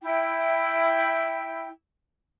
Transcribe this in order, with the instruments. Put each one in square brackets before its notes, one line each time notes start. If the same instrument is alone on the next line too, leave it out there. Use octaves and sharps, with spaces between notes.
[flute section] E4 G5